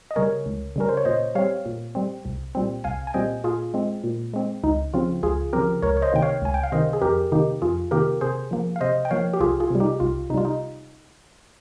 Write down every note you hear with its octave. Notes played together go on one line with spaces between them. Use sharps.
D#5
C#3 G3 C#4 A#4 C#5
C#2
C#3 G3 C#4 A#4
C5
C#5
A#2 C5 D#5
G3 C4 C#5 F5
A#2
G3 C4
C2
A#2 G3 C4
C2 F5 G#5
G#5
A#2 G3 C4 D#5 G5
A#2 F4 G#4
G#3 C4
A#2
G#3 C4
C#2 D#4
C#3 F3 C4 F4
C#2 F4 G#4
C#3 F3 C4 G4 A#4
C#2 A#4 C#5
C#5
C5 D#5
C3 D#3 A#3 G5
C#5 F5
C#2 G#5
G5
F5
C3 D#3 A#3 C5 D#5
G#4
F2 G4 A#4
C3 D#3 A#3 D#4 G4
F2 F4 G#4
C3 D#3 A#3 G4 A#4
C3 G#4 C5
F3 A#3
F5
C3 C5 D#5
G5
F3 A#3 C#5 F5
G4
C2 F4 G#4
F4 G#4
C3 G3
D#4 G4
C2 F4
C3 G3 D#4 F4
D#4